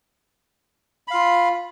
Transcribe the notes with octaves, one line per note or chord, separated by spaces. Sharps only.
F4 F5 B5